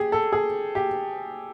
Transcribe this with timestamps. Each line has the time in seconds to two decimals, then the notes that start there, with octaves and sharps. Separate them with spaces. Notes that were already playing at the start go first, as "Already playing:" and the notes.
Already playing: G4 G#4
0.12 A4
0.33 G#4
0.75 G4